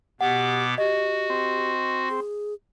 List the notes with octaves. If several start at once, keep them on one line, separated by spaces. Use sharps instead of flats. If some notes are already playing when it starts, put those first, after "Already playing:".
B2 B3 G4 F#5 D6
F#4 G4 D#5
C4
G#4